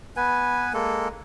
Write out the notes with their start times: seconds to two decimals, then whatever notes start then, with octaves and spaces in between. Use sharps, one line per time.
0.16 B3 B4 G#5
0.73 G#3 A#3 A4